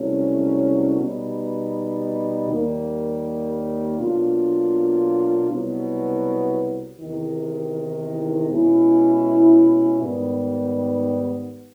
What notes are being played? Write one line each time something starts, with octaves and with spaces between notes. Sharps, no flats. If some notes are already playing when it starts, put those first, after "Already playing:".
Already playing: C2 B2 F#3 A3 C#4
B2 G3 B3 D#4
D#2 D#3 G3 A#3
B2 F#3 A#3 D4 F4
C2 B2 F#3 B3
E2 C3 D#3
B2 G#3 C#4 E4
G#2 D#3 G3 B3